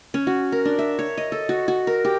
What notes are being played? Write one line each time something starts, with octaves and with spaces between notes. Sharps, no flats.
C#4
F#4
A#4
D4
E5
C#5
D#5
A4
F#4
F#4
A#4
G4